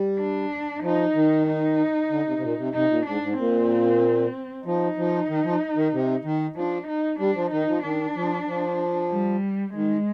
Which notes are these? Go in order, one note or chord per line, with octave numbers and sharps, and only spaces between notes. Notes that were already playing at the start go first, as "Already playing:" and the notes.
Already playing: G3
D4
F3 D#4
D#3
D#4
D3
C3
C3
A#2
C3
C3 D#4
A#2
G#2 D4
G#2
A#2 C4
F3 D#4
F3
D#3
F3
D#3
C3
D#3
F3 D4
D#4
G3 D4
F3
D#3 D#4
F3
D#3 D4
F3
F3
G3
D#3 G#3